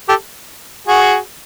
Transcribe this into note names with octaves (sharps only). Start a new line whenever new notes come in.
G4 A4
F#4 G#4